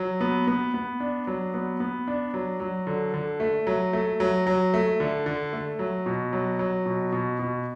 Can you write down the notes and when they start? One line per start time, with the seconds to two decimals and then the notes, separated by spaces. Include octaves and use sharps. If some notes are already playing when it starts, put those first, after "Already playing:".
Already playing: F#3
0.21 B3
0.47 B3
0.74 B3
1.00 D4
1.27 F#3
1.54 B3
1.80 B3
2.07 D4
2.34 F#3
2.60 F#3
2.87 D3
3.14 D3
3.40 A3
3.67 F#3
3.93 A3
4.20 F#3
4.47 F#3
4.74 A3
5.00 D3
5.26 D3
5.53 A3
5.79 F#3
6.06 B2
6.33 F#3
6.59 F#3
6.86 B2
7.12 B2
7.39 B2